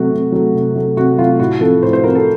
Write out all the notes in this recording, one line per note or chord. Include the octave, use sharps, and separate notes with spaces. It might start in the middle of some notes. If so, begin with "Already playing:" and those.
Already playing: C3 F#3 A3 F#4
C3
F#3 A3
C3
F#3 A3
C3 F#4
F#3 A3 F4
A2 F#4
F3 C4 A4
A2 C5
C5
F3 C4 A#4
A4